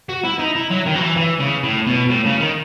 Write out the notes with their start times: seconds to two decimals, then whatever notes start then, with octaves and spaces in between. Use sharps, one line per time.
0.09 F#4
0.25 E4
0.39 D#4
0.56 E4
0.71 F#3
0.86 D#3
0.96 F#3
1.02 E3
1.17 E3
1.40 C#3
1.64 A2
1.87 B2
2.10 A2
2.26 C#3
2.40 D#3